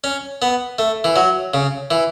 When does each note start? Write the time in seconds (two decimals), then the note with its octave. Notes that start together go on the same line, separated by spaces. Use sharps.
0.04 C#4
0.42 B3
0.79 A3
1.04 E3
1.16 F#3
1.54 C#3
1.91 E3